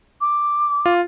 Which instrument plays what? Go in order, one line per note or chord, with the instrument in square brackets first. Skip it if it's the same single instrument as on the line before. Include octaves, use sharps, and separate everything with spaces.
[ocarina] D6
[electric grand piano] F4